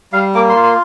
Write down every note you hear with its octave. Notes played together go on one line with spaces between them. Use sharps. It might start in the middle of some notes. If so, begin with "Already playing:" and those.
G3 F5
A#3 D6
C6
F4
C6